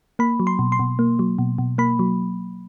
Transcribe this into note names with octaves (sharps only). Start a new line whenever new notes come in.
A#3 B5
F#3
C6
B2
C6
B2
A#3
F#3
B2
B2
A#3 B5
F#3